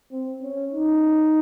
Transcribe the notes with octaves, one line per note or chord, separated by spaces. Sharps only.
C4
C#4
D#4